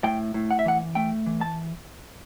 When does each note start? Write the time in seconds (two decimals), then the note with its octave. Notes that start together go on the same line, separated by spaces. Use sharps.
0.04 A2 G5
0.34 A2
0.51 F#5
0.59 E5
0.65 E3 F#5
0.95 A3 G5
1.26 E3
1.41 A5